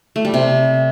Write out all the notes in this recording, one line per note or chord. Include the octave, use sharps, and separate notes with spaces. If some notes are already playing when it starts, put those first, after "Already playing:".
A3
G3
C3